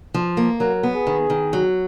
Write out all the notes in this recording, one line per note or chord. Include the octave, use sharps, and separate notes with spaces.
F3
A#3
F#3 A#4
B3
G#4
D#3
D#3
F#3